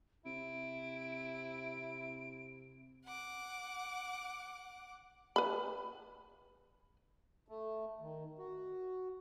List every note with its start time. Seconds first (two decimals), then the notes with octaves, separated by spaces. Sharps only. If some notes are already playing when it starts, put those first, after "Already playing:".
0.26 C3 E4 D7
3.04 F#5 D6
5.36 B4 B5
7.48 A3
8.01 D#3
8.38 F#4